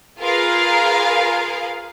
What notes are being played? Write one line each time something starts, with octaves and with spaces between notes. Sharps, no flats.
F4 G#4 A#4 B4 F5